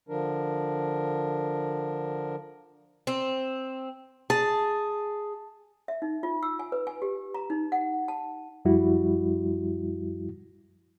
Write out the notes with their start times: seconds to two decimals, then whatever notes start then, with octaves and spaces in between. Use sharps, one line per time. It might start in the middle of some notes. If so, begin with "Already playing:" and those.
0.09 D3 F3 D4 A#4
3.07 C4
4.30 G#4 A5
5.88 E5
6.02 D#4
6.23 F4
6.43 E6
6.59 G#5
6.72 B4
6.87 G#5
7.02 G4
7.34 A#5
7.50 D#4
7.72 F#5
8.08 A5
8.65 F#2 F3 G3 E4 F#4